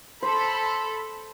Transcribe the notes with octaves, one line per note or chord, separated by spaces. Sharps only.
A4 C5 B5